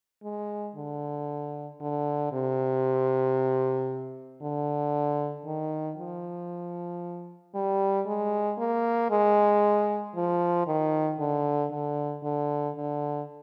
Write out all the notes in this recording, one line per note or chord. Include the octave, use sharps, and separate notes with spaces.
G#3
D3
D3
C3
D3
D#3
F3
G3
G#3
A#3
G#3
F3
D#3
D3
D3
D3
D3